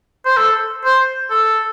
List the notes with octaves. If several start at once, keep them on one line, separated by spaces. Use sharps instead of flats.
C5
A4
C5
A4